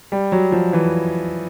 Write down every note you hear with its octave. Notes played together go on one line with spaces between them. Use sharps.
G3
F#3
F3
E3